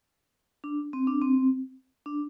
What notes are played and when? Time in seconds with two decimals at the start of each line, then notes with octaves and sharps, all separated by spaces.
0.64 D4
0.93 C4
1.07 D4
1.22 C4
2.06 D4